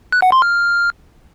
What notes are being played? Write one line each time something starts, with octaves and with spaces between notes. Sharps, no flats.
F#6
F#5
C6
F6